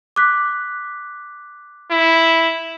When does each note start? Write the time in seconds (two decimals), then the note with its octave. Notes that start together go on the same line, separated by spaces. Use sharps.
0.16 D6 F#6 B6
1.91 E4